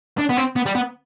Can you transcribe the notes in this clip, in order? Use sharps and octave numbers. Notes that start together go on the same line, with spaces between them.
D4
B3
C4
B3
G3
B3